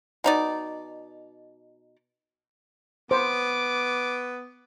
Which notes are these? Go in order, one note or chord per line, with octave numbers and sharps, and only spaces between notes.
B2 D#4 D5
B3 C5 D6